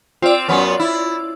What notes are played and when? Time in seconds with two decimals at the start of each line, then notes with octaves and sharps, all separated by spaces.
0.22 C4 F4 D5
0.48 F#2 B3 C#4
0.79 E4